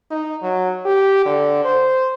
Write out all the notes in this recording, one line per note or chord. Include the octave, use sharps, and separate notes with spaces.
D#4
F#3
G4
D3
C5